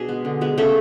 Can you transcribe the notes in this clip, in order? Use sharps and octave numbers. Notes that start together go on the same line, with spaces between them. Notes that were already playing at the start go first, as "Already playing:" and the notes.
Already playing: B2 D4 G#4
G#3 B3
D3
G#3 B3
C#3 A3 A4